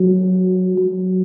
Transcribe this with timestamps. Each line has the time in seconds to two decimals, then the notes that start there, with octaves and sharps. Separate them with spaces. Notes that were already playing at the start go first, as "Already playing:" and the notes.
Already playing: F#3
0.77 F#3